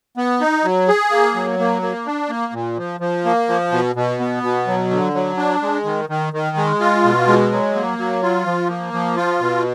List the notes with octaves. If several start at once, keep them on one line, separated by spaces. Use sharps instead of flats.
B3
D#4
F#3
G#4
A#3
F#3
A#3
A#3
D4
A#3
A#2
F3
F3
A#3
F3
B2
B2
B3
B2
F#3
D3
F#3
D4
G#3
D#3
D#3
D#3
G#3
F4
B2
G#3
F#3
A#3
F#3
F4
F3
A#3
F3
F4
B2